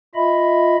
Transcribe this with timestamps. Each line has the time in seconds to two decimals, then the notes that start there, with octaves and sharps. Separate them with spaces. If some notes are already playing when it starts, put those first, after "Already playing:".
0.15 F4 D#5 E5 B5